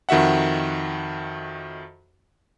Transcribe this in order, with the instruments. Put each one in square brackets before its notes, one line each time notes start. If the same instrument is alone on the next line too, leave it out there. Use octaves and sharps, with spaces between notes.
[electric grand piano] F2 D#3 F#4 E5 F#5